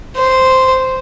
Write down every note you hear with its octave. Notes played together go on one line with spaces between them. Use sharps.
C5